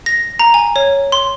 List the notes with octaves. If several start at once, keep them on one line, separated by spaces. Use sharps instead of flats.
A#6
A#5
G#5
C#5
C6